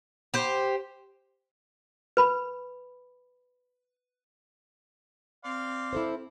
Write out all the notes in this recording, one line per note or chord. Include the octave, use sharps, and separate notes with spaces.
G4 C5
B4 B5
C4 D5 F5 C6
E4 A4 C5